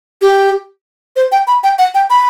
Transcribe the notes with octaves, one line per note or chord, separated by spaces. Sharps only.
G4
C5
G5
B5
G5
F#5
G5
B5